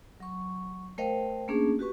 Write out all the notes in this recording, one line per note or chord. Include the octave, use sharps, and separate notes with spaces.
F#3 C#6
A3 A#4 C5 D#5 F5 G5
A3 A#3 C#4 D4 G#4
F#4 G4 B4 C#6